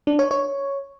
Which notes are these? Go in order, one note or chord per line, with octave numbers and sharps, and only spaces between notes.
D4
C#5
C#5